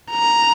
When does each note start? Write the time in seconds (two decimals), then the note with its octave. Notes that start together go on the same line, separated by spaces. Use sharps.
0.11 A#5